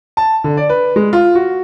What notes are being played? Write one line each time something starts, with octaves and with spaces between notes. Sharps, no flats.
A5
D3
D5
B4
G#3
F4
F#4